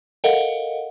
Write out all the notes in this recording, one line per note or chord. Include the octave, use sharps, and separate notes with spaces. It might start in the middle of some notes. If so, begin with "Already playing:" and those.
A4 A#4 D#5 F5 F#5